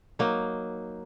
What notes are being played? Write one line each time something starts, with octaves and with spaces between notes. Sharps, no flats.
F#3 A#3 D#4